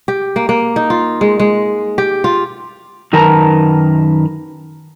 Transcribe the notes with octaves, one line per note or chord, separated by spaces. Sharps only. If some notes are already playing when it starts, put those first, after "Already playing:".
G4
A#3
A#3
D#4
F4
G#3
G#3
G4
F4
F#2 D#3 A#4 B4 A5 A#5